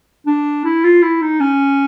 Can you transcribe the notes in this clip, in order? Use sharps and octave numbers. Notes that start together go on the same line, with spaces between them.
D4
E4
F4
E4
D#4
C#4